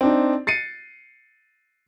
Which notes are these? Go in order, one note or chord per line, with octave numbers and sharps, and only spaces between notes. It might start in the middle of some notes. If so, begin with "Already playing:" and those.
C4 D4 D#4
A6 C7 C#7 D#7